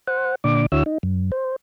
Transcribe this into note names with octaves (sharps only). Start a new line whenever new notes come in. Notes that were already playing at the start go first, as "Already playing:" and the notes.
C5 F#5
A#2 D3 D5 D6
D2 D3 E4 F#4 C#5 E6
D#4
F#2
C5